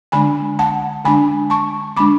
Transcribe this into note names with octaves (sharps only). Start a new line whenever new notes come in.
D3 G#3 D4 G#5 B5
F#5 A5
D3 G#3 D4 G#5 B5
A5 C#6
D3 G#3 D4 B5 D6